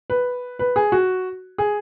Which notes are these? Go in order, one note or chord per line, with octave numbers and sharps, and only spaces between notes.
B4
B4
G#4
F#4
G#4